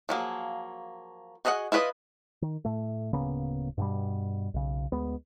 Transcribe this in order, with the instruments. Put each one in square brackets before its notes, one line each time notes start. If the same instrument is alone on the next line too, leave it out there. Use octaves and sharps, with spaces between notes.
[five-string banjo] F3 F#3 A#3 G#4
F#4 G#4 D#5 F5 F#5
E4 F4 B4 C#5 D#5
[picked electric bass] D#3
A2 A3
D1 C#3 A#3 B3
G2 B2 G3
B1 C#3
D2 G#3 B3